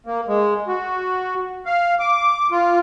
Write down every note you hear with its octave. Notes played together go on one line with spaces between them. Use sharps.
A#3
G#3
F#4
F5
D6
F4